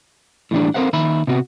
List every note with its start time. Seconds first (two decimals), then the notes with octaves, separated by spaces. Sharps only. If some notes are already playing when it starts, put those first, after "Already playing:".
0.51 A2 E3 G3 D4
0.74 C4 A4 A#4 C5 F5 F#5
0.93 D#2 D#3 E5 B5
1.27 C3 B3 F#4